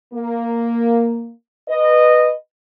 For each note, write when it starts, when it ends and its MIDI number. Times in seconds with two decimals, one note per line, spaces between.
0.14 1.31 58
1.69 2.31 71
1.69 2.31 75